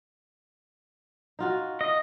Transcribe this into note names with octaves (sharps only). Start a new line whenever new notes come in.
D#4 F4 F#4
D#5